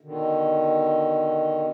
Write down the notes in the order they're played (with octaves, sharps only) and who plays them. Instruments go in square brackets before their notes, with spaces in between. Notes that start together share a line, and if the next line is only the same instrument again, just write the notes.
[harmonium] B2 D3 D#3